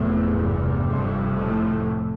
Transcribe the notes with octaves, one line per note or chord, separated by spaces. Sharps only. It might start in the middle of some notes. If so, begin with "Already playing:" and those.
Already playing: F1 E2 A2 C3 A3
G2 G3
F1 F2 C3
A2 A3